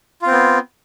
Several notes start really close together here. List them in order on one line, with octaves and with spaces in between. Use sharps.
F4 C4 B3